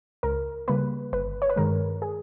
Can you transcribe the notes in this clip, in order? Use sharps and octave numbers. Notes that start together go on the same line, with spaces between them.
C#2 A#4
C#3 G3 A#3 B4
G1 B4
C#5
B4
G2 D#3 G#3 A#4
G#4